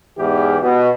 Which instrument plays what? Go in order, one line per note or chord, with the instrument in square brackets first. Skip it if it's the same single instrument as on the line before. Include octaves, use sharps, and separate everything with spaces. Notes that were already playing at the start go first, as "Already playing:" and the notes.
[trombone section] E2 G#2 E3 G4 G#4
B2